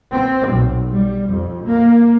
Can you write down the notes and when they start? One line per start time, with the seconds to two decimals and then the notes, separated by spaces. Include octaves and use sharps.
0.11 C4
0.48 B1
0.93 G3
1.31 F2
1.66 A#3